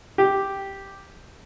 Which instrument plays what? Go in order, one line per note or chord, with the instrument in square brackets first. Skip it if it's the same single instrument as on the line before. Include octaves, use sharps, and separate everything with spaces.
[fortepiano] G4